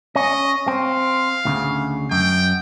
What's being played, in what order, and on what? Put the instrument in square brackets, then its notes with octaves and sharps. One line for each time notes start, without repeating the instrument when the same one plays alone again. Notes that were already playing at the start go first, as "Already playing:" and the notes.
[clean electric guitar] C#4 [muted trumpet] D#5
[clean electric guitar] C4 [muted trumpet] F5
[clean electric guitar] D2 A#2 C#3
[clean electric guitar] F#2 [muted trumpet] G5